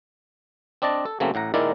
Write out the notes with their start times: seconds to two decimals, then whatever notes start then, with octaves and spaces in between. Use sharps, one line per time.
0.82 C4 D4 D5 D#5 A5
1.06 A4
1.20 C#3 F#3 A3 A#3 C4 C#4
1.34 A1 A2 F#5 A#5
1.54 A#2 D#3 G#3 E4 A#4 D5